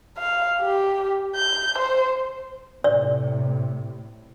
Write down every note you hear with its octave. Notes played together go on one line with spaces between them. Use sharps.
F5
G4
G6
C5
A2 C3 D5